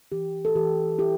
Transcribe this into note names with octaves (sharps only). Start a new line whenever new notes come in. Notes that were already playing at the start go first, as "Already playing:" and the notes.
E3 G4
A4
E3 G4
E4 G4